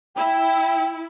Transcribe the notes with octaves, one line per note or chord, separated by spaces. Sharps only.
E4 G5